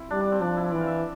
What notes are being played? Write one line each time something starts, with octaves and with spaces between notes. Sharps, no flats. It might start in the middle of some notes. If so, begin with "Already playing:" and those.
Already playing: C4 E4
G3 D4
D4
C4
F3 D4
E4
E3 D5
F5
E5